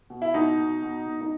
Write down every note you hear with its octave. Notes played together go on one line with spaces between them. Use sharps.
B2
E4
B2 D#4
B2
B2
B2
D#4